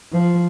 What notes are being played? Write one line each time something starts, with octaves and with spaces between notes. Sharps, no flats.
F3